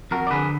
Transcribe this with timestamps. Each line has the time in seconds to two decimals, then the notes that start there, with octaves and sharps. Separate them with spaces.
0.11 F2 F#4 A#4
0.27 D5
0.31 D3 G#4 B4